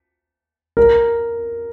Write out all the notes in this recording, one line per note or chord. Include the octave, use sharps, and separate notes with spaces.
A#4